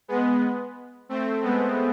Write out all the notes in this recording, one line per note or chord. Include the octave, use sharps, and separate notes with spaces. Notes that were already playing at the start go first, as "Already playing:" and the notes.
G#3 B3
A3 C4
G#3 B3